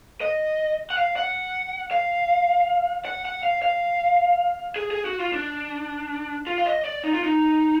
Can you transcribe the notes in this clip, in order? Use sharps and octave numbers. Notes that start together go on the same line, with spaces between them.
D#5
F#5
F5
F#5
F5
F#5
F#5
F5
F5
G#4
G#4
F#4
F4
D4
F4
F5
D#5
D5
D#4
F4
D#4